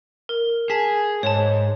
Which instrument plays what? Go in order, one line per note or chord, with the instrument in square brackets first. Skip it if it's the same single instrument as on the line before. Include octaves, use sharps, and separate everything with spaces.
[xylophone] A#4
[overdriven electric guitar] G#4 [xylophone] A5 B6
[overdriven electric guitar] G#2 [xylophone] C#5 A5